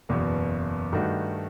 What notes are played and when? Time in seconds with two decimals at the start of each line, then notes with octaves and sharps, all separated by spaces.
0.09 F#1 E2 B2
0.93 G2 D#3 A3 D#4 F#4